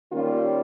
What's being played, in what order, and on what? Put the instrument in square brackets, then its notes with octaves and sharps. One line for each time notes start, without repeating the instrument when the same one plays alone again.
[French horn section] D#3 G3 A#3 C#4 F4